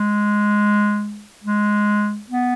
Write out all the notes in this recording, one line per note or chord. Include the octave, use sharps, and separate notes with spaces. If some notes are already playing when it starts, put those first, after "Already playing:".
Already playing: G#3
G#3
B3